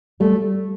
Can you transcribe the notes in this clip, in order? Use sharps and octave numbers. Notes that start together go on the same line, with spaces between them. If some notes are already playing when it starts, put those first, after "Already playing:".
G3 A3